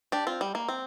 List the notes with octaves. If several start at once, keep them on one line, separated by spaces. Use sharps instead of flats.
D4 G4
C4 F4
G3
A#3
C4